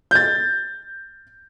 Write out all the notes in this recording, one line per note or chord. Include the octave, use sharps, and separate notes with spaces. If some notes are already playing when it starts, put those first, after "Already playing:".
G6 A6